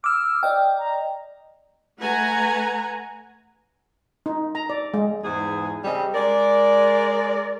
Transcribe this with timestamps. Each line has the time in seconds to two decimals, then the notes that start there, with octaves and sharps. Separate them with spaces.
0.04 D6 E6 F6
0.43 D5 D#5 G5
0.78 A#5
1.99 A3 B4 F#5 G#5 A#5
4.26 D#4
4.55 A#5
4.70 D5
4.94 G#3
5.24 E2 G#2 G#4
5.84 C#3 G3 C4 D#5
6.14 G#3 A#4 D5